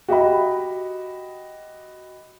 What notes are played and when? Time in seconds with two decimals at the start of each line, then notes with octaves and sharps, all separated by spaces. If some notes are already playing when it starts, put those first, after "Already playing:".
0.08 F#4 G4 D#5 B5